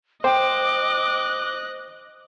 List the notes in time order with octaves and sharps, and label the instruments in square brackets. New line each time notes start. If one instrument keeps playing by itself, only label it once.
[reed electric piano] C5 [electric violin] D#5 F#6 [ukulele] G5 [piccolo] D6